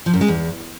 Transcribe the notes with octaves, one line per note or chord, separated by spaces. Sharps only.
F3
F#2
G#3
E2